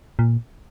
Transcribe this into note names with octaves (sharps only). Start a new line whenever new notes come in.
A#2